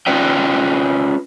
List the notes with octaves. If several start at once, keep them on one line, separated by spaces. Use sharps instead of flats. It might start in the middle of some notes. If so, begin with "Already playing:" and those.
C#4 F4 B4 D5 D#5 G5